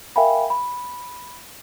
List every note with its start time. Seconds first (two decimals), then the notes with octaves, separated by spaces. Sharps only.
0.16 A#4 E5 F5 G5 G#5 B5
0.50 B5